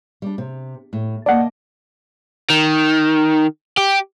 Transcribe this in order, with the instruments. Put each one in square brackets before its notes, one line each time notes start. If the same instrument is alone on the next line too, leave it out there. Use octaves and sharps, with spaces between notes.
[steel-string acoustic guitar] G3 D4
C3
A2
[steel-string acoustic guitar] A#3 D#5 A5 [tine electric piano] D5 F#5
[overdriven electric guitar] D#3
G4